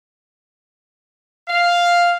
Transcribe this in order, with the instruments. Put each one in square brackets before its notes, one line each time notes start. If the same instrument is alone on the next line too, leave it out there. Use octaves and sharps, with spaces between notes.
[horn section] F5